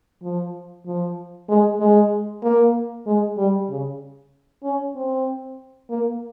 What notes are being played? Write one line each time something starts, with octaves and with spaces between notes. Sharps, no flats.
F3
F3
G#3
G#3
A#3
G#3
G3
C#3
C#4
C4
A#3